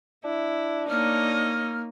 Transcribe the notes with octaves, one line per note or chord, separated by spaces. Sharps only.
D4 E4
A#3 D#4 C#5 D#5 F6